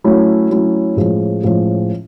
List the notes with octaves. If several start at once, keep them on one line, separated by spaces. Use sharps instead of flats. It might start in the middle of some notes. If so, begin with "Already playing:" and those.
F#3 A3 C#4 E4
F#3 A3 C#4 E4
A2 F3 G#3 C#4
A2 F3 G#3 C#4